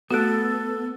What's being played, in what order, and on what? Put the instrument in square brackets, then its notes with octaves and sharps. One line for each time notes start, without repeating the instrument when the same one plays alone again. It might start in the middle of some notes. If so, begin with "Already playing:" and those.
[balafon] A3 F#4 [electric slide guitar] B3 [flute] A4